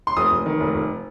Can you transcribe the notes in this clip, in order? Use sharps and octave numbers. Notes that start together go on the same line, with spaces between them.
C6
F1 D#6
F1
D#3
F1
F1